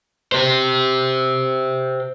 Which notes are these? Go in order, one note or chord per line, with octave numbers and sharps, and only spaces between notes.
G4 C5